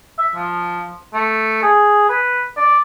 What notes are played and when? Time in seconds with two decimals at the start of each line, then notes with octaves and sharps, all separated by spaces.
0.18 E5
0.35 F3
1.14 A3
1.63 G#4
2.10 B4
2.57 D5